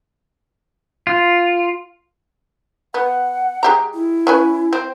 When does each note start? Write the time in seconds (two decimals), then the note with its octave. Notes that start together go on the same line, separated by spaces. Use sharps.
1.07 F4
2.94 B3 F#5
3.63 G#3 G4 A#5
3.94 E4
4.27 C#4 B4 G#5
4.73 C4